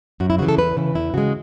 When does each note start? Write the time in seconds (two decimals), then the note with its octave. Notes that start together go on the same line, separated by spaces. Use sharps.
0.20 F#2 F#4
0.30 E4
0.38 C#3 E3 F#4
0.49 A4
0.58 E2 B4
0.77 C#3 E3
0.95 E2 E4
1.14 C#3 G#3 F#4